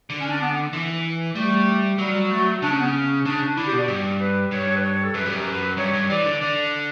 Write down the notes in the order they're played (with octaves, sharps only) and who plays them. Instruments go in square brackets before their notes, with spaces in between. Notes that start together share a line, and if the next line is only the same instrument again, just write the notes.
[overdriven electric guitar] D3
[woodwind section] C#4
D4
B3
B3
[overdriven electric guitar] E3
[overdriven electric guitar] G3 [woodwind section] A3
[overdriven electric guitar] F#3 [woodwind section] G3
[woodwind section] A3
[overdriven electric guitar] C#3 [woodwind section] D4
[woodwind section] C#4
B3
C#4
[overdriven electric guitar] C#3 [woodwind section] D4
[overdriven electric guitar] D3 [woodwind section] E4
[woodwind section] G4
[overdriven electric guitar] B2
[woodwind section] D5
[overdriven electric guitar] G2
[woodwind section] B4
[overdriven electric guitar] G2 [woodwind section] C#5
[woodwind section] B4
C#5
A4
[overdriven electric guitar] F#2 [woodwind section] B4
[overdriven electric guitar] G2 [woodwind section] G4
[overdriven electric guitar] F#2
[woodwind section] B4
[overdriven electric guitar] G2 [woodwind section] C#5
[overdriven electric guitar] G2
[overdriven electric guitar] E3 [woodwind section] D5
[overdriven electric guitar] D3
[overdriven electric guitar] D3 [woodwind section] D5